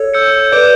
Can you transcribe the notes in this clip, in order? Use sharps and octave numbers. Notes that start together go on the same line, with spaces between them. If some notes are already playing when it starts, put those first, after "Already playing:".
Already playing: A4 C#5
E6 G6 C#7
B4 D5 D6 G6 D7